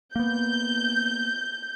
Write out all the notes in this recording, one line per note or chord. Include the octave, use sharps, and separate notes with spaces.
A#3 B3 G6